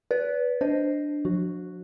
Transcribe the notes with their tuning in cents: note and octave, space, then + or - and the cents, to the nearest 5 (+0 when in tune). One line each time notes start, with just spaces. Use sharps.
B4 +0 D5 -35
D4 +0 C5 +0 D#5 +0
F3 +40 F#4 +0